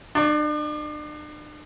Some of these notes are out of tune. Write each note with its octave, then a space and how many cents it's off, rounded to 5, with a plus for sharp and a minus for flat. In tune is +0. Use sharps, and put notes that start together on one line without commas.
D4 +40 D5 -20